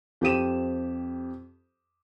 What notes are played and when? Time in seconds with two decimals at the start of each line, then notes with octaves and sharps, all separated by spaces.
0.21 F2 G4 C5 D#7 E7